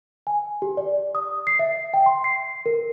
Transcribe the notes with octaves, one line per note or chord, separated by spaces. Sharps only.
G#5
G4
D5
D#6
C7
E5
G5
C6
C7
A#4